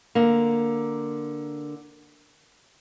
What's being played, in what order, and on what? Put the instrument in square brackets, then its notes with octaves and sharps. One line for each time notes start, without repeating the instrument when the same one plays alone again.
[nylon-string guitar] D3 A#3